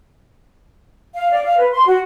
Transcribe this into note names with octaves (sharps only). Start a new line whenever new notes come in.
F5
D5
F5
B4
C6
F#4